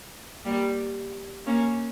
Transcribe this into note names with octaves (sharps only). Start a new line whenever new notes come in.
G3 A#3
A#3 C#4